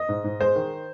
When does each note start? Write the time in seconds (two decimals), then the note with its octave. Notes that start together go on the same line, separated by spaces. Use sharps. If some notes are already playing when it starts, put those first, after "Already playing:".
Already playing: D#5
0.09 G#2
0.24 G#2
0.40 G#3 C5
0.56 D#3